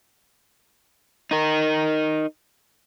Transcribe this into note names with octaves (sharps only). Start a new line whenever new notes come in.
D#4 A#4